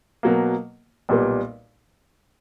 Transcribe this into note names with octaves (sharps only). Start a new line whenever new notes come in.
B2 F#3 A#3
B1 A#2 G3 B3